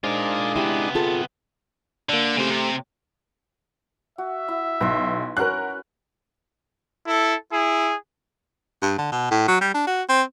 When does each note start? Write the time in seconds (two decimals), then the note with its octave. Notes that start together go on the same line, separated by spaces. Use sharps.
0.04 G#3 D4 D#4 F4 A#4 C5
0.56 C3 B3 E4 G4
0.95 F4 G#4 A4 A5
2.09 D3 A#3 D4
2.37 C#3 A3 C4 G4 C5
2.50 C3
4.18 F#4 E5
4.48 E4
4.81 B1 B4 C6
5.37 C#4 F#4 A#4 B4 F#6
7.07 E4 A4
7.52 E4 G#4
8.82 G2
8.98 D3
9.12 B2
9.31 A2
9.48 F#3
9.61 G3
9.74 D4
9.87 F#4
10.09 C4